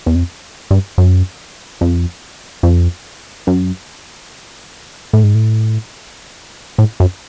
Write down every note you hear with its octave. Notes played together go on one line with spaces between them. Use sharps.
E2
F2
G2
F#2
F2
F2
F#2
A2
G#2
A2
A2
F#2